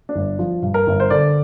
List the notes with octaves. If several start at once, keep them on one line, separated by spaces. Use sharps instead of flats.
D4
G1
F3
G2
A#4
G1
C5
D3 D5